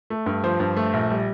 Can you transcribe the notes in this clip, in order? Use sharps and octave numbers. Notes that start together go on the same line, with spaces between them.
A3
G2
F3 C5
G2
A3
A#1
G3